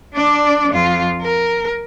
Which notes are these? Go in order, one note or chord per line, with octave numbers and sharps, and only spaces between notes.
D4 D5
F2 F4
A#4